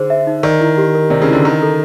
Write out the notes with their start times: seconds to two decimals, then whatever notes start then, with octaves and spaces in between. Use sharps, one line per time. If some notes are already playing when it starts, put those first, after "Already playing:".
Already playing: D3 D#4 G#4 C5
0.10 E5
0.27 D#4
0.43 D#3 D5
0.61 E4
0.78 G4
0.95 A#4
1.10 C3 D5
1.22 C#3
1.28 D3 E4
1.45 D#3 A#5
1.62 A4